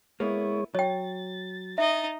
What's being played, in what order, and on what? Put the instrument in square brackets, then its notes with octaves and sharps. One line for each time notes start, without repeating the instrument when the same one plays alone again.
[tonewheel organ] G#3 C#5 [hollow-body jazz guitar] A#3 B3 E4
[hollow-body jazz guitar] F#3 [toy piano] C#5 G5 [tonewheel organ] A6
[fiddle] D#4 D#5 [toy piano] E5